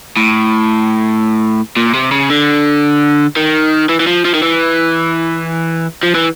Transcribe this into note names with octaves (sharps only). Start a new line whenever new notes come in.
A2
A#2
C3
C#3
D3
D#3
E3
E3
F3
F3
D#3
E3
F3
E3